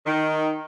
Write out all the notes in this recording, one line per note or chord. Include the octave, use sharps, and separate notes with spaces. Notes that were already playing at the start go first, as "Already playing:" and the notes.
D#3